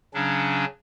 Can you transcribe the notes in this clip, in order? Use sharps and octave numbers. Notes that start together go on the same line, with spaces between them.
C#3 F#3 C#4 D4